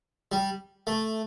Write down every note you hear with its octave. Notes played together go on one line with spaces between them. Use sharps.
G3
A3